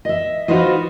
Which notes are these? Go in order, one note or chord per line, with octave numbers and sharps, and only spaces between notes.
D#5 E5
D#4 F4 F#4 B4 C5 D#5